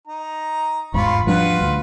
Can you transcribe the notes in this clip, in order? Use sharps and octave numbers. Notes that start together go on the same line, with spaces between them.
D#4 A#5
G1 E2 G#2 F4 B5 C#6
F3 G3 D4 F4 F#4 B4
D2